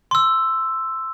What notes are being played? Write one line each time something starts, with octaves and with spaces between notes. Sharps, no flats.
C6 E6